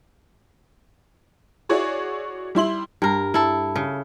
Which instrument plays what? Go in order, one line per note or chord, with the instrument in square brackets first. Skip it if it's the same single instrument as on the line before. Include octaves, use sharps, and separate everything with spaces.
[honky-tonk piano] E4 F#4 G#4 C#5 D5
G3 E4 C6 F#7
[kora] G2 A#4
E4 A4
C#3